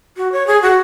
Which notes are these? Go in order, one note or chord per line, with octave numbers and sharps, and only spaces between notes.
F#4
C#5
G#4
F#4